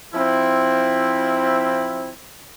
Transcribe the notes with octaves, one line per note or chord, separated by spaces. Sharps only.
F3 C4 E4